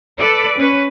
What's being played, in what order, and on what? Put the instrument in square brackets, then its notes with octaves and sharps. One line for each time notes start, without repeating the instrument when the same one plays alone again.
[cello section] A4 B4 D5
C#4 B4